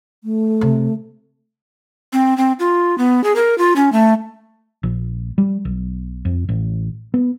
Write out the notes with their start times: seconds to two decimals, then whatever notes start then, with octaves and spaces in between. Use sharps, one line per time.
0.24 A3
0.61 C3
2.13 C4
2.37 C4
2.59 F4
2.98 B3
3.24 G#4
3.36 A#4
3.58 F4
3.76 C#4
3.92 A3
4.83 A#1
5.38 G3
5.65 B1
6.25 F2
6.49 A1
7.14 B3